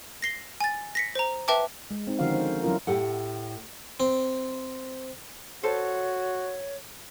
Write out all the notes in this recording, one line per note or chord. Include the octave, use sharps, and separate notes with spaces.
A#6 C7 G7
G#5 A6
A#6 B6 C#7
C5 A#5
B4 E5 G5 A5 D6
G#3
C4 D#4
D3 D#3 F3 C#4 F#4 F5
C5
E3 F#3 C#4 E4 F4 A#4
A2 G4 A4 F#5
C4
F#4 A4 C5 C#5